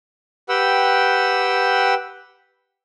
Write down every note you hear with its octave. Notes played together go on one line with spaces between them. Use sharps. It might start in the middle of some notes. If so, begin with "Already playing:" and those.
G4 B4 F#5 G5 E6